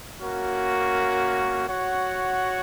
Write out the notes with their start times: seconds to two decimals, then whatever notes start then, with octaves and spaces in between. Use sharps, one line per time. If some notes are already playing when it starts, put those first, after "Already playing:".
0.19 A#3 C#4 F#4 A#4
1.67 F#4 C#5 F#5